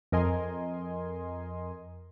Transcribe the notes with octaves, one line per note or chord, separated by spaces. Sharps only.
F2 A#4 D#5 G#5 C6